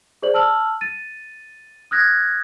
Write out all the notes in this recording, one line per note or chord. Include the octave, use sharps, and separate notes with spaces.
G#4 C5 D5 F#7
A5 E6 F6 F#7
A6 D#7
D#6 F6 F#6 G#6 A#6